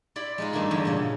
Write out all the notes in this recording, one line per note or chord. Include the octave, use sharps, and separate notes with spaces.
E4 D5 B5 C6
G#3 D#4 F4
G2 D#3 A3 A#3 E4 C6
E2 D3 E3
A#2 C#3